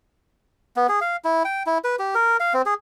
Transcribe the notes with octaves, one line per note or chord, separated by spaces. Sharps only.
B3
G#4
F5
E4
G5
E4
B4
G4
A#4
F5
C4
G#4